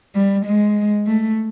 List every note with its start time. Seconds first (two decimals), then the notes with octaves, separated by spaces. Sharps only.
0.15 G3
0.45 G#3
1.07 A3